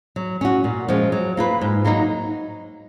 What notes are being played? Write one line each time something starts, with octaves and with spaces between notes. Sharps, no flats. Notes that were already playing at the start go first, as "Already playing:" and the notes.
F#3
C#4 F#4
A#2
F3 G#3 C#4
F#3
A#3 F4 B4
G#2
F#3 A#3 D#4